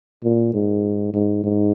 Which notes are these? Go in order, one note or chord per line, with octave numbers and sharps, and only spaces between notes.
A#2
G#2
G#2
G#2